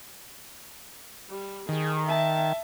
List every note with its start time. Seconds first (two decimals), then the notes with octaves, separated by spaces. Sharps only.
1.29 G3
1.69 D#3 G#4
2.06 E5 A5